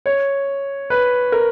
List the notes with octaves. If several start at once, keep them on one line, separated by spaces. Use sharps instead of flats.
C#5
B4
A#4